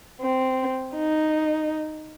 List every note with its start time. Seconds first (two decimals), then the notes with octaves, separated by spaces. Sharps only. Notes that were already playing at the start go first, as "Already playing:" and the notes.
0.21 C4
0.95 D#4